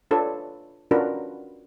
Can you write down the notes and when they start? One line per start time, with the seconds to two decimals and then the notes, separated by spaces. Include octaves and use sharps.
0.11 D4 F4 A4 B4 C#5 D5
0.91 C#4 D4 F4 F#4 A#4 B4